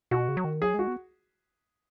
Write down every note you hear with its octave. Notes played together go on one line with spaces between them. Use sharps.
B2 F#4
C#3
F#3
D#3
F#3 G#4
G#3 F#4
B3